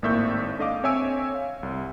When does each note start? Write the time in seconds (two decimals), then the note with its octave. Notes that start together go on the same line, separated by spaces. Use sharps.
0.02 G#1 A2 A#3 E5 C#6 G6
0.58 D4 A4 D#5 F5 D6
0.83 C4 C#5 E5 G#5 E6 D7
1.35 F5
1.63 C2